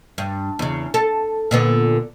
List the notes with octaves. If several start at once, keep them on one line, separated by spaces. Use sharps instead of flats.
G2
E2 C#3
A4
A#2 D3 B3